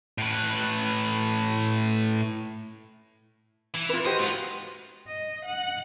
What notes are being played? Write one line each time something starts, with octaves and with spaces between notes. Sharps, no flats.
A2 B4
E3
F4 B4
F#4 G4 C5 D#5
G#2 F4
D#5
F#5